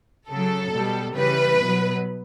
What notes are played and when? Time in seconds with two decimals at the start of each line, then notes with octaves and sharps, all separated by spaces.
0.29 C#3 F#3 A4
0.73 B2 G3
1.16 C#3 E3 G3 B4
1.59 B2 F#3